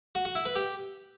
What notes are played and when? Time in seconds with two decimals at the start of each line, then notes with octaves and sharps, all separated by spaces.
0.15 F#4
0.25 F#4
0.35 E4
0.45 B4
0.56 G4